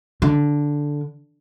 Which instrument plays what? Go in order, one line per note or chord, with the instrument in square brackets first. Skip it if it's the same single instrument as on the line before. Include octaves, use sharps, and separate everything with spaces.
[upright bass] D3